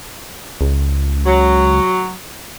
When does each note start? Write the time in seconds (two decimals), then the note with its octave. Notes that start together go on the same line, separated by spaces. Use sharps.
0.61 C#2
1.25 F#3